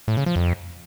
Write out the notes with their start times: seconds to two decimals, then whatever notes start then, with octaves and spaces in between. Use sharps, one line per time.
0.08 A2
0.17 C#3
0.26 F3
0.36 F2